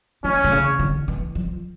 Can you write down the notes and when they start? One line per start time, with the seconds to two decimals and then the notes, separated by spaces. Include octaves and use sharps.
0.24 D#3 C#4
0.44 C3
0.52 C#3
0.79 D3
1.08 E3
1.35 F3